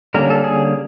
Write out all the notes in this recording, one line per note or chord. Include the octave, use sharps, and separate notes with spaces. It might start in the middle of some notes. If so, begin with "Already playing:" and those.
D3 G3 A#3 C#4 A#4
A4
G#4